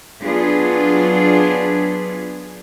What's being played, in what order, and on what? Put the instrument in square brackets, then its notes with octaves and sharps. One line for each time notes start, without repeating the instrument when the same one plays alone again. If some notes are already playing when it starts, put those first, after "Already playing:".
[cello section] F#3 B3 D4 F4 G#4